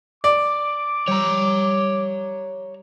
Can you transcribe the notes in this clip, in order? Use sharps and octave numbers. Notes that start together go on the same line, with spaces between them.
D5 D6
G3 C#5 A#5